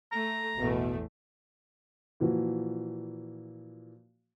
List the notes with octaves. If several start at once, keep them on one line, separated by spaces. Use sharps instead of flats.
A3 A#5
A1 E2 B2 A3
A#2 E3 F3 F#4